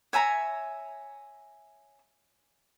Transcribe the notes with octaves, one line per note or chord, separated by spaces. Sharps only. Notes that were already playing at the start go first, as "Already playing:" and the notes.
C#5 E5 G#5 A#5